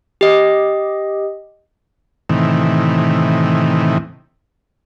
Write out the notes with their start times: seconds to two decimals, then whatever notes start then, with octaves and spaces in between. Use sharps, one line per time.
0.21 G4 D#5
2.29 A2 C3 D#3 E3